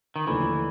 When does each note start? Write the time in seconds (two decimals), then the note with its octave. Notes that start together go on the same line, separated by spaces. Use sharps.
0.16 D#3
0.27 D#2 D3 E3 F3 A3 D4